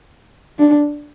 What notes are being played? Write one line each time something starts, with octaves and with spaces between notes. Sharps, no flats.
D4